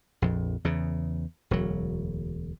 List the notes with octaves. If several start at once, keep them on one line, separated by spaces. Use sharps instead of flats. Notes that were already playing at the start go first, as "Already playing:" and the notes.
A#1 F2
E2 C#3
E1 D2 F#3